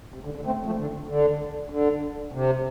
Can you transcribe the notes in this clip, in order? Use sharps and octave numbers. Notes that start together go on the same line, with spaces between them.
C3
D3
D3
A3 C4
F3 A3
D3
D3
D3
C3